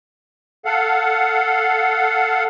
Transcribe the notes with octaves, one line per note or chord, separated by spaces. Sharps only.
A4 F5 F#5